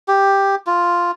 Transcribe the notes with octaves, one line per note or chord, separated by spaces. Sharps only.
G4
F4